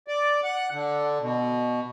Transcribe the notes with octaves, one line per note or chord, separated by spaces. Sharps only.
D5
F#5
D3
B2